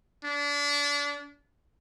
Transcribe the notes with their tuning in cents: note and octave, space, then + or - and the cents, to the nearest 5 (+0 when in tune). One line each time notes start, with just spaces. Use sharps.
D4 -30